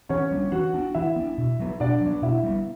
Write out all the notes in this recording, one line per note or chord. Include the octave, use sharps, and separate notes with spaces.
E3 C#4 C#5
G3 B3 D4
E3 F#4 F#5
B3 D4
E3 E4 E5
B3 D4
B2
F#3 B3
B2 D4 D5
F#3
B3
B2 E4 E5
G3 B3